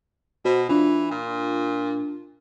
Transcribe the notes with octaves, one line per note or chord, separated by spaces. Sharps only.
B2 F#4 C5
E3 D4 F4
A#2